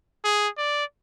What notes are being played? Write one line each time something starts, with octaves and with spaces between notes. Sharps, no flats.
G#4
D5